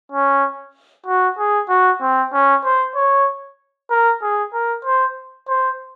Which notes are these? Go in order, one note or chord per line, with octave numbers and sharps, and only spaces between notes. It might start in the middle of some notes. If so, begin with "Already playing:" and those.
C#4
F#4
G#4
F#4
C4
C#4
C5
C#5
A#4
G#4
A#4
C5
C5